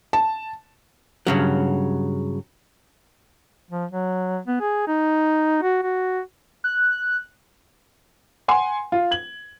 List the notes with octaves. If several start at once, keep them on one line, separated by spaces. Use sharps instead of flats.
A5
G2 C#3 F#3
F3
F#3
B3
G#4
D#4
F#4
F#4
F#6
F#5 G#5 C6
F4
G#6 F#7